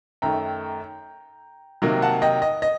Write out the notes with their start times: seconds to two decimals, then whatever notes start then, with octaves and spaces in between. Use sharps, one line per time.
0.22 F#2 D#3 A3 G5 A#5
1.82 C3 D#3 F#3 A#3
2.02 F#5 A5
2.22 D#5 G5
2.42 D#5
2.62 D#5